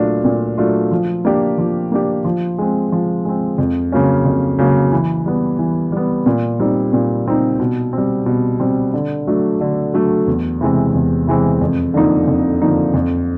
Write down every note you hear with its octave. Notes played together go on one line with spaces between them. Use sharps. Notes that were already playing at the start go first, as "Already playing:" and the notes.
Already playing: A#2 F#3 A3 D4 F4
A#2
F#3 A3 D4 F4
F3
A#3 D4 G4
F3
A#3 D4 G4
F3
G#3 C4
F3
G#3 C4
F2
C#3 F#3 A#3 C#4
F2
C#3 F#3 A#3 C#4
E3
G3 B3
E3
G3 B3
A#2
G3 C4 D#4
A#2
G3 C4 D#4
B2
G3 C4
B2
G3 C4
D3
F#3 A3 D4
D3
F#3 A3 D4
E2
C3 E3 G#3 C4
E2
C3 E3 G#3 C4
F2
D3 F3 A#3 D#4
F2
D3 F3 A#3 D#4
F2